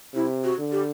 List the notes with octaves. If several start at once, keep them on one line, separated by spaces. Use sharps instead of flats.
C3 E4
F#4
D3
G4